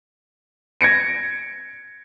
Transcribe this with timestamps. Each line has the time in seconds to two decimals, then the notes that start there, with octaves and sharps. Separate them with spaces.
0.81 G#6 A#6 C#7 D7